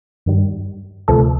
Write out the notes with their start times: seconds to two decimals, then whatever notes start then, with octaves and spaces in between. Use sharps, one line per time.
0.26 G2 D#3 G3
1.08 D2 C3 F3 A3 A4